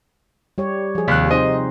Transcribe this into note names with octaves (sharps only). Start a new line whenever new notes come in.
G3 G4 C#5
F3 G#4
D#2 C3 F#6
C4 D#4 C5 D#5